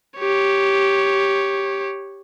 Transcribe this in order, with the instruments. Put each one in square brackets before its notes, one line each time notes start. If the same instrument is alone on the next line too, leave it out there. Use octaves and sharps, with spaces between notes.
[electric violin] G4 C#5